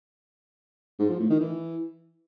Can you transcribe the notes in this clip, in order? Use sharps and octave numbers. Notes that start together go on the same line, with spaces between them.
G#2
F3
A2
D#3
E3